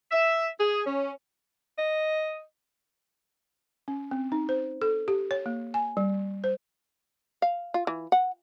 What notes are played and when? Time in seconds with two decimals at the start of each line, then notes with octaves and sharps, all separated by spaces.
0.11 E5
0.59 G#4
0.85 C#4
1.78 D#5
3.88 C#4
4.11 C4
4.32 D#4
4.49 C5
4.82 A4
5.08 G4
5.31 C#5
5.46 A#3
5.74 G#5
5.97 G3
6.44 C5
7.42 F5
7.74 F4
7.87 E3
8.12 F#5